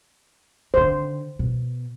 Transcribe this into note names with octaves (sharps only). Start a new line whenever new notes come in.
D3 D#3 C5
B2